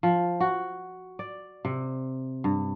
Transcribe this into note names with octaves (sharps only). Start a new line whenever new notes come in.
F3
F#4
D5
C3
G2